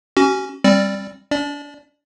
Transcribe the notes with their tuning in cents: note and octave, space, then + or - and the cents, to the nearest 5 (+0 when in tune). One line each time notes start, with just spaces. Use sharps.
C#4 +0 F#4 +40
G3 +20 C4 +20 D5 +0
D4 -35 D5 +10